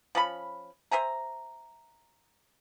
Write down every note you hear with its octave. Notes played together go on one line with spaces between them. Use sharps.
F3 C#4 B5
C5 E5 G#5 A#5